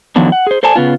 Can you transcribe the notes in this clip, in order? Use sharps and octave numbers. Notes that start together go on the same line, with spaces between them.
D3 D#3 F3 F#3 B3 D4
F#5
G#4 C5
A4 C5 D5 G#5 A5
C#3 B3 F4